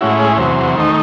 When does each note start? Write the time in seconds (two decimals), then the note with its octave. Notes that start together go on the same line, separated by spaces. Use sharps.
0.01 A2 G#3 C#4 E4 F#4
0.20 G#4
0.38 E2 C3 F#3 C5
0.75 D#3 A3 D#4